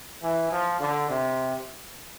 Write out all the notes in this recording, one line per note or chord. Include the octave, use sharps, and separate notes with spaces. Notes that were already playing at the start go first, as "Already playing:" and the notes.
E3
F3
D3
C3